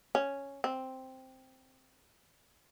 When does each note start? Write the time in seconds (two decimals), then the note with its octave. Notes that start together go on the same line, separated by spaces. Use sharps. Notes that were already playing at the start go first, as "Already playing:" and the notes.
0.15 C#4
0.64 C4